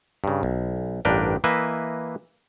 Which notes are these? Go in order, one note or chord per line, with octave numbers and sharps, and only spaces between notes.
G2 C#3
B1
A1 G2 D4 A#4 B4 G5
E3 A#3 B4 D#5 E5